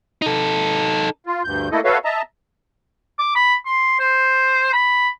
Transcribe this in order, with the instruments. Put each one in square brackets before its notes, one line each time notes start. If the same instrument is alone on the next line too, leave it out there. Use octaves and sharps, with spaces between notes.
[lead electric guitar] D#4 A4
[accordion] F4
D2 G2 G6
A3 A#3 E4 A4 D#5
F#4 A4 B4 C#5 E5 F5
D#5 E5 A5 A#5
[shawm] D6
B5
C6
C5
B5